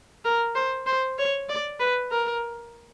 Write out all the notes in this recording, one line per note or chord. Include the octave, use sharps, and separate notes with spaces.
A#4
C5
C5
C#5
D5
B4
A#4